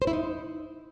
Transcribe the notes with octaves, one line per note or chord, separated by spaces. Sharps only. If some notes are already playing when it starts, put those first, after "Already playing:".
C5
E4
D#4